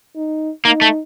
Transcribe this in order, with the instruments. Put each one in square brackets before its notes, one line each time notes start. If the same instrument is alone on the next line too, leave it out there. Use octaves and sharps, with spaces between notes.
[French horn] D#4
[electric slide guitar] A#3 [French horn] D#4
[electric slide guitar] A3